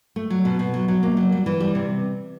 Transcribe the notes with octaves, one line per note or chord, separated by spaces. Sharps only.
A3
F#3
B2
B2
F#3
F#3
A#3
F#3
G3
E3
G3
C3